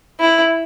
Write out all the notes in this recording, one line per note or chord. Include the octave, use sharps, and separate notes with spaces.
E4